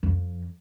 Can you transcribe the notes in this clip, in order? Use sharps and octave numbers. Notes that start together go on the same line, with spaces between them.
F2